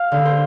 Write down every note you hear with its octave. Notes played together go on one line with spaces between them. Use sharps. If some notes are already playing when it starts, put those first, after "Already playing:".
Already playing: F5
D3
C5